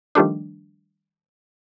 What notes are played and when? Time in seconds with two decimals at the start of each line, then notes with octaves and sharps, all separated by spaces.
0.15 D#3 F3 G3 A3 D4